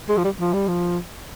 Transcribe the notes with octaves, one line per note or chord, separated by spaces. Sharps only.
G#3
F3
G3
F3
G3
F3